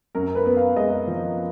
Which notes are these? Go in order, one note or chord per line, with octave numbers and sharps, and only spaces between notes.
F#2 A#4
B4
B3
F5
G#3 D#5
F3